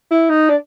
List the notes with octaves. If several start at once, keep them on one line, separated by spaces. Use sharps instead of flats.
E4
D#4
D4